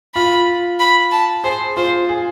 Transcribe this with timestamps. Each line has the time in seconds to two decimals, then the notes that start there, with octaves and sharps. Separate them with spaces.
0.15 F4 B5
0.80 B5
1.12 A5
1.44 G#4 C5
1.77 F4 C5
2.09 G#4